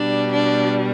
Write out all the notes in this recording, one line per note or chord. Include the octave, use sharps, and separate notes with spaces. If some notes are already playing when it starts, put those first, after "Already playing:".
Already playing: B2 G3 D4
D4